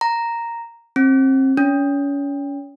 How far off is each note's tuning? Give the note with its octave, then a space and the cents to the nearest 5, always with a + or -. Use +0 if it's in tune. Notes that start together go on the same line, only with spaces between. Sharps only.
A#5 -5
C4 +30
C#4 +30